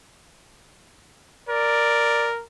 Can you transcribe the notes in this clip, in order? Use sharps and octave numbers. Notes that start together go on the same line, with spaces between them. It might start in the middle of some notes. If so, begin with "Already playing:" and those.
A#4 D5